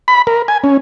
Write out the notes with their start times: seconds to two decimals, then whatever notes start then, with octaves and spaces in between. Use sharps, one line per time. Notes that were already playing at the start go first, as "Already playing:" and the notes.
0.08 B5
0.27 A#4
0.48 G#5
0.64 C#4